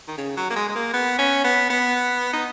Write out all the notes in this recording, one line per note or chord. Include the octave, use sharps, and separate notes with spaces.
D#3
C#3
F#3
A#3
G#3
G#3
A#3
B3
C#4
B3
B3
D#4